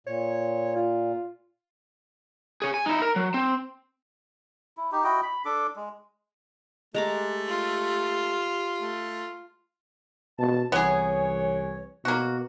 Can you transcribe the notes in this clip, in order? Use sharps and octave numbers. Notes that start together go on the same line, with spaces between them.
A#2 C#5
F4
G#4 C#5
G#5
D#4 E4
A#4
F#3
C4
E4
D#4 G4
E4 F#4 D#5 G5
B5
D4 A4 D6
G#3
G#3 A3 G4 A#5 D6
F4
A3
B2 A5
C2 E3 B3 G#4 C#5
B2 A#3 F#4